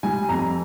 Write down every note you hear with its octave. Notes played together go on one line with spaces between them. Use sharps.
G3 G#5
F2 A#5